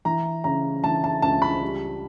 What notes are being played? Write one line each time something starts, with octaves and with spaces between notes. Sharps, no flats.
E3 A#5
C#3 A#5
E3 A5
A5
C#2 A5
B5
G3